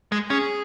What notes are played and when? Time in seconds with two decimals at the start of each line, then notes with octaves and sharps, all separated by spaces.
0.12 G#3
0.30 C#4 G#4